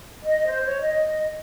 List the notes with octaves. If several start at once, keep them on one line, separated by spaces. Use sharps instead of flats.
D#5
C5
C#5
D#5